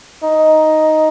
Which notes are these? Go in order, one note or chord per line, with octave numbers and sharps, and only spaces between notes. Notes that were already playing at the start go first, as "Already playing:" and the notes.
D#4